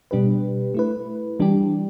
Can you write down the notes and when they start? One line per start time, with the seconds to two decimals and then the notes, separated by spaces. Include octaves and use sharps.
0.11 B2 G3 D4 G4 B4
0.74 A3 E4 B4
1.40 E3 G3 D4 G4